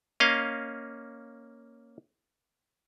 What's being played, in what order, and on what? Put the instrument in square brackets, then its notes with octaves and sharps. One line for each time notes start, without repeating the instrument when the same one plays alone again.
[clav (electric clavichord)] A#3 C#4 D#5 F5